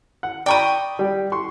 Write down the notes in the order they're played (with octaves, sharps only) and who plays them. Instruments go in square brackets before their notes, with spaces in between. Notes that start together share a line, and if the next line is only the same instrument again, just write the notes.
[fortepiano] F#5
[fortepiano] D5 A#5 B5 [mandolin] G5 C#6 D#6
[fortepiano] G3
C6 C#6